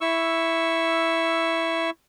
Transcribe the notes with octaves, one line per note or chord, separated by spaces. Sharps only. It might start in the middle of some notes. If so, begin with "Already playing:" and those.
E4 C#6 E6